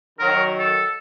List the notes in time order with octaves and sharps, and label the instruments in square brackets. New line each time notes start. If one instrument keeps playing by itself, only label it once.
[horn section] D#3 F#3 [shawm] A#4
[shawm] A4